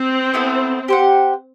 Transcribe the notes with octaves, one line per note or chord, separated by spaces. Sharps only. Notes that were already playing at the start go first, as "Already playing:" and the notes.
Already playing: C4
B3 E4 A4
G4 C5 F#5